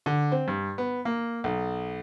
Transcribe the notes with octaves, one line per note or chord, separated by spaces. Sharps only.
D3
C4
G2
B3
A#3
B1